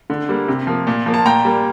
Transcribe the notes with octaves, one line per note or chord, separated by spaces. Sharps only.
D3
G3 A#3
C3
F3 A#3
A#2
F3 A#3
A5
A#2 G5 A#5
G3 A#3